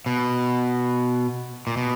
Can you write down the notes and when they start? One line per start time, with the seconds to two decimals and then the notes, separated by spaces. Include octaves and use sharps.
0.06 B2
1.67 A#2
1.77 B2